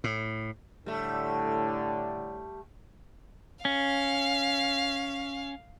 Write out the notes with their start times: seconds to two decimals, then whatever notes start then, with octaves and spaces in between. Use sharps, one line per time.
0.04 A2
0.86 A2 D3 G3 A3
3.65 C#4 F5